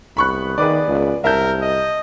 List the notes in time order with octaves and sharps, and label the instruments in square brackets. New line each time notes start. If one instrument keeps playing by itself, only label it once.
[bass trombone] C2 [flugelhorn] B3 [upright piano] B5 C#6 F#6
[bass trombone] D#3 [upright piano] G#4 B4 D5
[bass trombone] C#2
[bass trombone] C2 [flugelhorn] A#4 [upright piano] E5 A5 G6
[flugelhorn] D#5